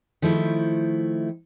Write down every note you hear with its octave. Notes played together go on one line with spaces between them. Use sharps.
D#3 F3 A3 E4